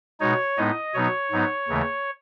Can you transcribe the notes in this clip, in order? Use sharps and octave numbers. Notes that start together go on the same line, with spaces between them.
B2 G#3 D#4 C#5
A2 G#3 B3 D#4 D#5
B2 F#3 B3 D#4 C#5
G#2 F#3 B3 D#4
D#2 C#3 E3 A3